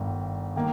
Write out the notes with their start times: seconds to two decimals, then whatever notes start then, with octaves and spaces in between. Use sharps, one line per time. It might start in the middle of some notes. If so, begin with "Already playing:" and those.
Already playing: G1 G2 D#3
0.56 D#3 A#3